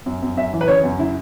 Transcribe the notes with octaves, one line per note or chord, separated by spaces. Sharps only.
F#2
F#2
F#2 E5
E3
B4
C#3 C#5
F#2
C#3 E4